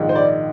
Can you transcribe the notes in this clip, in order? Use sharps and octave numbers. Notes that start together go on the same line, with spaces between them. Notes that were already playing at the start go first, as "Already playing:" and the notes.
Already playing: A#1 G#2 D#3
C5
D5